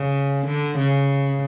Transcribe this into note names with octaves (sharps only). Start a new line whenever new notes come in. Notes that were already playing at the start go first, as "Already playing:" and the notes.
Already playing: C#3
D3
C#3